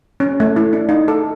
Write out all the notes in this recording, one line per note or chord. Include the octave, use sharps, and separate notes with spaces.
C#4
A3
E4
D4
D#4
A4